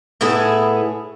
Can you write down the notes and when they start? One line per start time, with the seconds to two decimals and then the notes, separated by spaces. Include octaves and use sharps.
0.21 A2 B3 E4 G#4